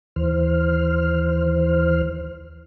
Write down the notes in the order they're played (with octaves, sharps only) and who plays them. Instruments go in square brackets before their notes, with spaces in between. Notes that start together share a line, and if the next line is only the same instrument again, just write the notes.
[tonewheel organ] D#2 E3 C5 F6